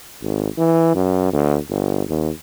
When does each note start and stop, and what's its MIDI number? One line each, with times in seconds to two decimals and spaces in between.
0.22 0.48 32
0.58 0.92 52
0.95 1.29 42
1.33 1.58 38
1.69 2.03 31
2.09 2.30 39